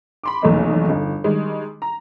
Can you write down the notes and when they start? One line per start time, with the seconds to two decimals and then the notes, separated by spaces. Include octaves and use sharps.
0.24 B5 C6 D6
0.42 F1 B1 E2 A3 A#3 D#4
0.89 G1 D#4
1.24 D#3 G3 G#3
1.82 A#5